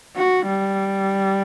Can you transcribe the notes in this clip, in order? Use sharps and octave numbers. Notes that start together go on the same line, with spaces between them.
F#4
G3